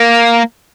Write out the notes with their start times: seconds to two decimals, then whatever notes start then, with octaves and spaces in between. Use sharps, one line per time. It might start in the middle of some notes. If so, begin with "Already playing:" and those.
Already playing: A#3